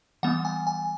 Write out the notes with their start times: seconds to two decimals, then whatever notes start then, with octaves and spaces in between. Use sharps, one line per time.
0.23 E3 G3 B3 F#5
0.45 G#5
0.67 G#5